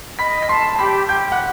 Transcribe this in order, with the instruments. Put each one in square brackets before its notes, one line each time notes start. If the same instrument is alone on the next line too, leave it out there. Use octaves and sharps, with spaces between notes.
[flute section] D#5 [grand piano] B5 B6
[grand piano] B6
[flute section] A5 [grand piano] C6 C7
[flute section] G4 [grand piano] B5 B6
[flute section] G4 [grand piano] G5 G6
[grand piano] F#5 F#6